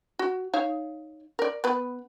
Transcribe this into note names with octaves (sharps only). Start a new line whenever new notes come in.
F#4
D#4 C#5 F5
A#4 D5
B3 B4